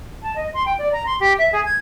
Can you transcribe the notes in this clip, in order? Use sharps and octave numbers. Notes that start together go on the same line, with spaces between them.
A5
D#5
C6
G5
D5
A#5
C6
G4
E5
G#4
G#6